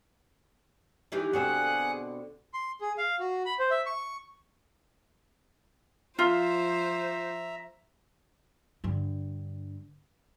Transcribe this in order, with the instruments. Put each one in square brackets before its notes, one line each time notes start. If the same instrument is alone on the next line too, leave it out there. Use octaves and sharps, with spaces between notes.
[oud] D#3 E3 G4
[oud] B2 D3 C4 [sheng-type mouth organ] G#4 F#5 F#6
[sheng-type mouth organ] C6
G#4
F5
F#4
B5
C5
E5
C#6
[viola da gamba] F3 C5 [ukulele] F4 [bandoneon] E5 A#5
[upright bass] G2 D3